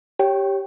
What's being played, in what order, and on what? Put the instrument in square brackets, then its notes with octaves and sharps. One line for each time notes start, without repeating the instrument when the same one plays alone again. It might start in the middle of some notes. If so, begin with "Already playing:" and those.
[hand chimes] G4 C#5 G5